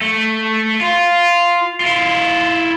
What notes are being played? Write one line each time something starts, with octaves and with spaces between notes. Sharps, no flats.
A3
F4
E4 F4